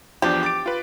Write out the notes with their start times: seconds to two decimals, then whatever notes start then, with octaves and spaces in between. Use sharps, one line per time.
0.22 E2 F3 D4 G4
0.43 D6 A6 D7
0.66 F4 B4